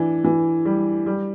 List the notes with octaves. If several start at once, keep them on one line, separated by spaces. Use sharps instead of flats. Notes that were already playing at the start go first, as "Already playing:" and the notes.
Already playing: E3 D4
E3
G3
G3